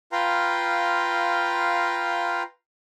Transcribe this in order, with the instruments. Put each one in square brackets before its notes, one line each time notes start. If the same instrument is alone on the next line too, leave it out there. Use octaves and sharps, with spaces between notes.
[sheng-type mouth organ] F4 B4 F5 G5 A#5 C6